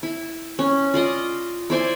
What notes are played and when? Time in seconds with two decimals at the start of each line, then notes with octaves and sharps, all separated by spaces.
0.03 E4
0.59 C#4
0.94 F4 D5 D#5
1.70 E4 C5 D5 G#5